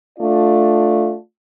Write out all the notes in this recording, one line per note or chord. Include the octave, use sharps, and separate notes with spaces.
A3 D4 F4 D5